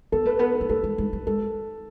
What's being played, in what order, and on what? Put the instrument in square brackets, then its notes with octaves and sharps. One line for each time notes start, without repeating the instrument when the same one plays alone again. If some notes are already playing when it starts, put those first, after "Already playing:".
[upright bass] B3 [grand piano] A4
[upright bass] A3 [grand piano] B4
[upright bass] B3 [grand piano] B4
[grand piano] A4
[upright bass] B3
[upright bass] A3 [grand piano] A4
[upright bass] G#3
G#3
F#3
[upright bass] G#3 [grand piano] A4